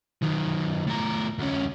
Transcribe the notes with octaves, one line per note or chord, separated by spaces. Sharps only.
D#3 F#3
A2 A#4
D2 C#4